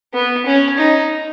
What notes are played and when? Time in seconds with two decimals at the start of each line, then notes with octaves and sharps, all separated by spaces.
0.14 B3
0.46 C#4
0.78 D#4